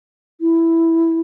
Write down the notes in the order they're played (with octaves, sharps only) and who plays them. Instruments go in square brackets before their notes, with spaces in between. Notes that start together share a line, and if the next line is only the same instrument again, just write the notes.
[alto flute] E4